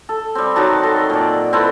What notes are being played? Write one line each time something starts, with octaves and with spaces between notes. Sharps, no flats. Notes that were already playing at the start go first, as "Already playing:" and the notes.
A4
G3 C4
D#3 F#3 F#4 A5
A4 C6
A#2 D5
C4 E4 A4 B4